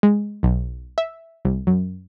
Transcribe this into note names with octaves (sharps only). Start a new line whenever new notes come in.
G#3
B1
E5
C2
F#2